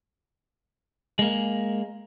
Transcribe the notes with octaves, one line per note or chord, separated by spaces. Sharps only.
G#3 A#3